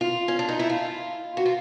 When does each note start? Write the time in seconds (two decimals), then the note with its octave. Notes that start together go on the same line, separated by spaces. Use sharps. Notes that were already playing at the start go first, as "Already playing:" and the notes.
0.01 F4
0.28 C#4
0.39 D4
0.49 D#4
0.59 E4
0.70 F4
1.37 F#4
1.46 F4